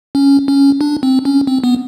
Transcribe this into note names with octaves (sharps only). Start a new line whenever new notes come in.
C#4
C#4
D4
C4
C#4
C4
B3